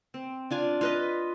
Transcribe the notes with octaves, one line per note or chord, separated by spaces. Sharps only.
C4
D4 F4 G#5
F4 B4 D#5